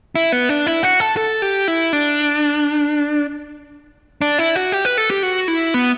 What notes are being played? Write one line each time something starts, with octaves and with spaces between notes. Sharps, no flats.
E4
B3
D4
E4
F#4
A4
A4
G4
E4
D4
D4
E4
F#4
G4
B4
A4
G4
F#4
E4
B3